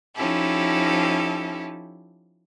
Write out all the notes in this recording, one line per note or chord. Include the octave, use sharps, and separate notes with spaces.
F3 C#4 D#4 E4 G4 A4